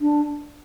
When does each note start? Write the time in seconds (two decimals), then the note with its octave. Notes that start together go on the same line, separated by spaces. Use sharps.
0.01 D4